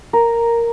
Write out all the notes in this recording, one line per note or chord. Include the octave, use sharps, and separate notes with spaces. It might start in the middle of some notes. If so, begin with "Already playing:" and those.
A#4